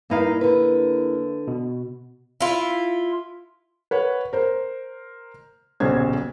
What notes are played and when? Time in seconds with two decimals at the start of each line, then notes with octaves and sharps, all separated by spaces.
0.10 G2 A#3 D#4 E4 A#4 F5
0.41 D3 B4
1.48 B2
2.41 E4 F4
3.91 B4 C#5 F#5
4.33 A#4 C5
5.80 D#1 B1 C#3 C5 G#6